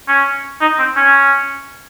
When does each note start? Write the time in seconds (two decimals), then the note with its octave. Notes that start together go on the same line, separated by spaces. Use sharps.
0.08 C#4
0.61 D#4
0.79 C4
0.96 C#4